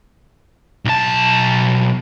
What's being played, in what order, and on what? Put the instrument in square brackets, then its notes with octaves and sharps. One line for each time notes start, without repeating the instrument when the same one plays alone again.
[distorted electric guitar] B1 A5